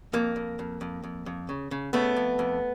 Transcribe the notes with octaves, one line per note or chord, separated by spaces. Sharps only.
F2 A#3
F2
F2
F2
F2
F2
C#3
C#3
C#3 A3 B3
F2
F2